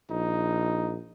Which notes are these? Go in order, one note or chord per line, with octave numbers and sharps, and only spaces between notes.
A#1 D#4